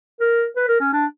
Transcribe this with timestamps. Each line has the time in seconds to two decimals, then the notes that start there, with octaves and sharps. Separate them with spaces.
0.20 A#4
0.56 B4
0.68 A#4
0.80 C#4
0.93 D4